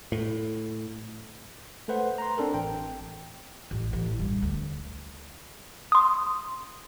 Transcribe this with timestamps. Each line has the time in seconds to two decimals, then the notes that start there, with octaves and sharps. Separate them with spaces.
0.12 A2
1.88 A3 A4 B4 C5 F#5
2.18 A#5 C6
2.38 C4 D4 A4 A#4
2.54 A1 G5
3.71 A1
3.93 A1
4.19 G2
4.42 D2
5.92 C6 D#6